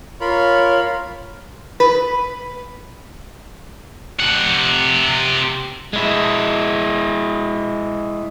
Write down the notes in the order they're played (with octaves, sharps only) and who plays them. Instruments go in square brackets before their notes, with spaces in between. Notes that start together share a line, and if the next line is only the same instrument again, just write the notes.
[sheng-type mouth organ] F4 A#4 B5 [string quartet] C#5
[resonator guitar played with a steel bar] B4
[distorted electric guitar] C3 F#5
[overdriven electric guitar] G#3 E4